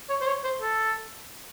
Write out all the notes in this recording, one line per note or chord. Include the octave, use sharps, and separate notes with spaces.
C#5
C5
C#5
C5
A4